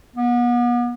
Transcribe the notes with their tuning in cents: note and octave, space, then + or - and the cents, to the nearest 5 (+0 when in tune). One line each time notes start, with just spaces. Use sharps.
B3 -35